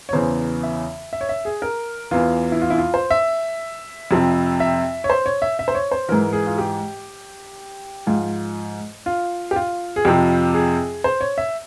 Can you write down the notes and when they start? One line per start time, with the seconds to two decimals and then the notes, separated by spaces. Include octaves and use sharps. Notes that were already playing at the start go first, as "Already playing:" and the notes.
0.09 C#5
0.13 E2 C#3 E3 C5
0.63 E5
1.13 E5
1.21 C#5
1.29 E5
1.45 G#4
1.62 A#4
2.11 E2 E3 F4
2.52 E4
2.62 F4
2.70 E4
2.78 F4
2.94 C5
3.11 E5
4.11 F2 C3 F3
4.60 E5
5.04 C#5
5.10 C5
5.26 C#5
5.42 E5
5.59 E5
5.68 C5
5.75 C#5
5.92 C5
6.08 G#2 E3 A#4
6.33 G#4
6.47 F4
6.58 G4
8.07 G#2 F3 F4
9.06 F4
9.51 G4
9.56 F4
9.96 G#4
10.05 F2 C3 F3 G4
10.54 G#4
11.04 C5
11.21 C#5
11.38 E5